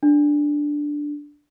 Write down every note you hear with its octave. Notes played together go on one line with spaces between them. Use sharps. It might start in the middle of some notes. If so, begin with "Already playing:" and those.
D4